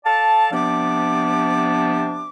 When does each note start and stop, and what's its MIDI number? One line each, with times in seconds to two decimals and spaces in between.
0.05 0.49 69
0.05 0.49 74
0.05 0.49 77
0.05 0.49 81
0.52 2.29 48
0.52 2.29 53
0.52 2.29 59
0.52 2.29 62
0.52 2.29 74
0.52 2.29 86